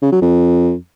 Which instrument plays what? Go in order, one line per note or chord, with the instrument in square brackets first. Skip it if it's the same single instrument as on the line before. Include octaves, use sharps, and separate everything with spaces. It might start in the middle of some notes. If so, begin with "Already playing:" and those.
[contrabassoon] C#3
F#3
F2